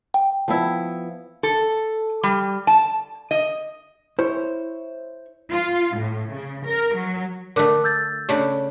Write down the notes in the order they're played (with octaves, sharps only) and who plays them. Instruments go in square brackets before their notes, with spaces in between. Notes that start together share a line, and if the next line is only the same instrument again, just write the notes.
[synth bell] G5
[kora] F3 B3 E4
[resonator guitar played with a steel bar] A4
G3
A5
D#5
[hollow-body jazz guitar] E4 C5 C#5
[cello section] F4
A2
C#3
A#4
F#3
[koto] D3 A3 [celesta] A#4 D6 F#6
[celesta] E6 G6 A6
[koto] C#3 A3 D4